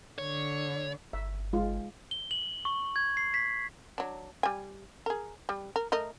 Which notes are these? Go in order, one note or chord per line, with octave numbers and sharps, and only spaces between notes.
D3 C#5
G1 E5
G#3 F4
G7
F#7
C#6
G#6
C7
B6
F#3 D4
G3 G#5
G#4 A#4
G3
A#4
A3 A#4 D#5